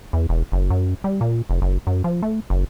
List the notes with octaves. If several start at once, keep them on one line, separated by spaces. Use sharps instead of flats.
E2
E1
F#1
F#2
G3
A#2
F1
F#1
F#2
F3
A3
F#1